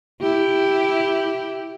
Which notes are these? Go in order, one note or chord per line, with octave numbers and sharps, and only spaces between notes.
E4 G4